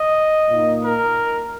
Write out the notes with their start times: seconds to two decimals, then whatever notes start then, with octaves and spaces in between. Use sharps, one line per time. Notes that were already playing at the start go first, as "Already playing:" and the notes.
Already playing: D#5
0.50 A#2 A#3 D#4
0.83 A#4